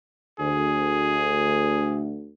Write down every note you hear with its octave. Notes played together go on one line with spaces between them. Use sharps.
D2 G#4